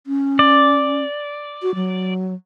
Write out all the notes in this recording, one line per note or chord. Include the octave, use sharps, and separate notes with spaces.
C#4
D5
F#4
F#3